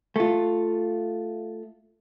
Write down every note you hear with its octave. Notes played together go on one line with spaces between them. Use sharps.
A3 F4